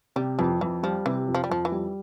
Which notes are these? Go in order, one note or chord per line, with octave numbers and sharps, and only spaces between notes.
C3 G3
F2 E3
F2 E3
F3 G3
C3 E3
F2
F3
G3
F2 F3
E3
G3